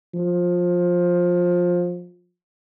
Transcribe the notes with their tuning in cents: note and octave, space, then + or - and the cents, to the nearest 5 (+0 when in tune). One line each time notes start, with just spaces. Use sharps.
F3 +20